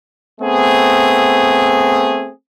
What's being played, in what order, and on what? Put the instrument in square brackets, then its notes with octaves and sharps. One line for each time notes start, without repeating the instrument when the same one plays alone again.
[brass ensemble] A3 B3 C4 G#4